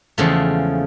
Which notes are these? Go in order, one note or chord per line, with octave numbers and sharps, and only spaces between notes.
E2 C#3 F3 G#3 A3